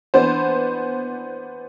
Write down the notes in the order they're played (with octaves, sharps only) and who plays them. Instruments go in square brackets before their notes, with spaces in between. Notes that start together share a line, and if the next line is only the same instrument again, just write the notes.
[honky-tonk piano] E3 B3 D4 C5